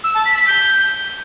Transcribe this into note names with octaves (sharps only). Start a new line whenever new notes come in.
E6
A5
B6
B6
G6